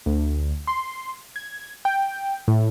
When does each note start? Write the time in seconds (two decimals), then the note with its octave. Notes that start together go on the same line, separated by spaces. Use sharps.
0.06 D2
0.67 C6
1.36 G#6
1.85 G5
2.48 A2